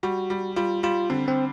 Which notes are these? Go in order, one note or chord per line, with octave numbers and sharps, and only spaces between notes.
G3 F#4
G3
G3 F4
G3 F4
D3 C4
C4